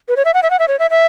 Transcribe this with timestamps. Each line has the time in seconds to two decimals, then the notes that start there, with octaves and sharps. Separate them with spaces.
0.08 B4
0.17 C#5
0.25 E5
0.34 F#5
0.43 E5
0.51 F#5
0.59 E5
0.68 C#5
0.79 E5
0.91 E5